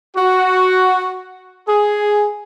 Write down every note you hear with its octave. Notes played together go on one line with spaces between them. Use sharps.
F#4
G#4